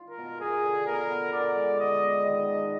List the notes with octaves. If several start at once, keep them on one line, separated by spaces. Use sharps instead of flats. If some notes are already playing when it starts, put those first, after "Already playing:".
Already playing: F4
A#4
B2
F4 G#4
D3
B3 A#4
B3
D3 D5
G#3
D3 D#5
B3
D#3 D#5
D4